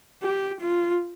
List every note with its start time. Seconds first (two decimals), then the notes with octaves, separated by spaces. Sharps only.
0.22 G4
0.60 F4